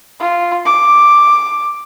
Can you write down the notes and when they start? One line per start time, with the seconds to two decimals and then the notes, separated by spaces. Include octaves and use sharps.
0.20 F4
0.65 D6